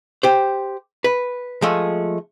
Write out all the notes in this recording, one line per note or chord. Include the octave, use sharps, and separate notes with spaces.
G4 C5
B4
F3 G#3 A3